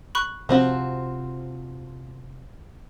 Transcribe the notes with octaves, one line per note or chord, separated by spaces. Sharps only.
B5 C#6 F#6
C3 F3 C4 F#4